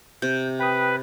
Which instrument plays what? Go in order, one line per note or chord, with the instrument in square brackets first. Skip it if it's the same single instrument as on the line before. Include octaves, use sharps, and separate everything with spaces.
[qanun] C3 [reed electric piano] G6
[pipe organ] B4 [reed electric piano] G5 D#6